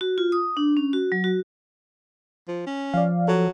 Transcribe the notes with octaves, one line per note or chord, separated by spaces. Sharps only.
F#4
F4
D#6
D4
C#4
F#4
F#3
F#4
F3
C#4
F3 D5 F5
F#3 A4